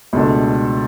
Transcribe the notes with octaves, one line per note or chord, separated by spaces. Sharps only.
C#2 B2 A3 D4